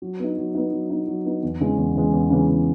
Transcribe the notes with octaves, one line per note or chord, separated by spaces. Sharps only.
F#3
B3 D#4
F#3
B3 D#4
F#3
B3 D#4
F#3
B3 D#4
E2
C#3 E3 G#3
E2
C#3 E3 G#3
E2
C#3 E3 G#3
E2